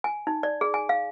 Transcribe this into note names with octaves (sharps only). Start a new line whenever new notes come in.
G#5
D#4
D5
G#4
G#5
F5